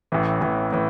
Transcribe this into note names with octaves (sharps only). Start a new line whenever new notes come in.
A1 A2 E3
A1 A2 E3
A2 E3